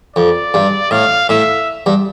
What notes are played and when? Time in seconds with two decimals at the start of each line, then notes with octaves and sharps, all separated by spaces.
0.16 F2 D5
0.54 G2
0.91 A2 F5
1.29 A2 E5
1.86 G2